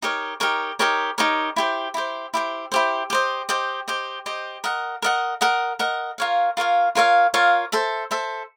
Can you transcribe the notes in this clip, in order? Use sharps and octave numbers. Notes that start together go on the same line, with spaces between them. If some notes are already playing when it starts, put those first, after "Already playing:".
D#4 G4 A#4 C#5
D#4 G4 A#4 C#5
D#4 G4 A#4 C#5
D#4 G4 A#4 C#5
E4 G4 C5
E4 G4 C5
E4 G4 C5
E4 G4 C5
G4 C5 D#5
G4 C5 D#5
G4 C5 D#5
G4 C5 D#5
A#4 D#5 F#5
A#4 D#5 F#5
A#4 D#5 F#5
A#4 D#5 F#5
F4 A#4 C#5 F5
F4 A#4 C#5 F5
F4 A#4 C#5 F5
F4 A#4 C#5 F5
A4 C5 E5
A4 C5 E5